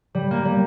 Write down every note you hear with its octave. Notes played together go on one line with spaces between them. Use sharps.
G3
A#3
G3